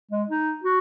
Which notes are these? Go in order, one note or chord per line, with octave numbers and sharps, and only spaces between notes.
G#3
D#4
F#4